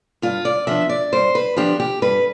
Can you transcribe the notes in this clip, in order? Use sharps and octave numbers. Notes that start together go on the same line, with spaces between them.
G2 F4
D5
F3 B3 D4 E5
D5
G2 C5
B4
F3 B3 D4 G4
G4
G2 B4